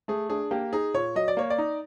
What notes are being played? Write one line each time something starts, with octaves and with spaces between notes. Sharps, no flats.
A3 G#4
D4 G#4
A#3 G4
D#4 G#4
A#2 C#5
F#3 D#5
D5
A#3 C#5
D5
D#4